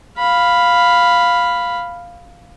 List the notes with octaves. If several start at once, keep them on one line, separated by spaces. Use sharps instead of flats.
F5 B5